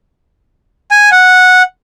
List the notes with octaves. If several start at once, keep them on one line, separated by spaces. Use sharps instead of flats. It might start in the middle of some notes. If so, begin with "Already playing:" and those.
G#5
F#5